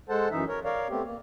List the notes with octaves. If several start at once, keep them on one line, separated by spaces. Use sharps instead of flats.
G#3 A4 C5 F#5 A5
F#2 E3 D#4 E5
A#4 C#5
A#4 C#5 D5 F5
A3 B3 C4 G4
A#3